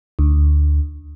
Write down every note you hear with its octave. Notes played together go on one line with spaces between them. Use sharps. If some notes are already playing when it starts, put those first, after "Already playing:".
D2